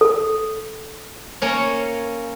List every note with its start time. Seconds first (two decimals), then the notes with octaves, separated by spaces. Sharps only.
0.01 A4
1.42 A#3 C#4 C#5